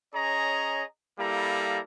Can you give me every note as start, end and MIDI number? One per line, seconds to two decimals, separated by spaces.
0.14 0.84 61
0.14 0.84 68
0.14 0.84 73
0.14 0.84 75
0.14 0.84 82
1.19 1.80 55
1.19 1.80 58
1.19 1.80 64
1.19 1.80 69
1.19 1.80 77
1.19 1.80 82